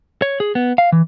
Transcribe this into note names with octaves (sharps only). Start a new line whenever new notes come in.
C#5
G#4
B3
F5
E3